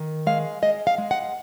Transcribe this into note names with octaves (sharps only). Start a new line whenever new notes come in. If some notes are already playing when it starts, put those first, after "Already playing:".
Already playing: D#3
G#3 F5
G#3 D#5
F5
G#3
F#5